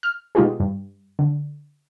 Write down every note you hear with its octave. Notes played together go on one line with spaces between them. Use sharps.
F6
B2 G#3 D#4 F4 G4 G#4
G2
D3